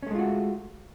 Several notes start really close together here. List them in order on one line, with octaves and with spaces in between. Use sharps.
C#4 A3 G#3 F4 F#4